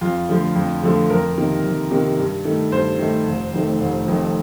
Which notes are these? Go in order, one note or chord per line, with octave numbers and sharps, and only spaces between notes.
F2 F4
D3 F3 A3
F2
D3 F3 A3
F2 A#4
C3 D#3 A#3
F2
C3 D#3 A#3
G2
D#3 A3
G2 C5
D#3 A3
F1
F2 D#3 A3
F1
F2 D#3 A3